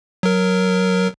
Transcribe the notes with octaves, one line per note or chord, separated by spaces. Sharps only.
F#3 A#4